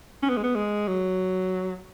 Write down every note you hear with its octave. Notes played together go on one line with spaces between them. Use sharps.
C#4
B3
G#3
B3
G#3
F#3